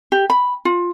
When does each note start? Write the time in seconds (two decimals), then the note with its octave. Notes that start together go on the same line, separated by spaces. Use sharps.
0.12 G4
0.30 B5
0.65 F4